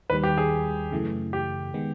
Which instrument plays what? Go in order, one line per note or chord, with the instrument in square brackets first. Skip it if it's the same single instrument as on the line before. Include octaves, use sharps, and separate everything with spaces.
[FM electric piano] D#2 D#3 G3 [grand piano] B4
[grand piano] G4
G#4
[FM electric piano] F#2 C#3 E3 A3
[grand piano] G4
[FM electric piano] D#3 G#3 B3